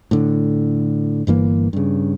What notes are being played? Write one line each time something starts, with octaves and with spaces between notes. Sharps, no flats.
A2 D3
G1 G2 E3 A#3
G2 C#3